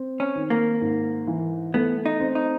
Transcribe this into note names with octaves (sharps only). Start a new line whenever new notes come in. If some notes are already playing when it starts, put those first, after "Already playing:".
Already playing: C4
C#4
D#3
A#3
G#2
E3
A3 B3
D#4
C4
D#4